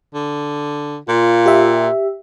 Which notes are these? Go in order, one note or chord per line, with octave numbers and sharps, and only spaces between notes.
D3
A#2 F4
G4 E5